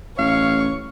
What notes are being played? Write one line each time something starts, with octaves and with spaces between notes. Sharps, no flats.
A1 C#5 F5 C#6